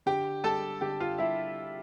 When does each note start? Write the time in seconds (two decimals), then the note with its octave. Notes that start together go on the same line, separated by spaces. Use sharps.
0.06 D3 G4 G5
0.44 G3 A4 A5
0.81 D3 G4 G5
1.00 F4 F5
1.18 G3 E4 E5